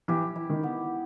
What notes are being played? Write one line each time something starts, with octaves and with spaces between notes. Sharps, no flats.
E3 G4
E4
D#3
B3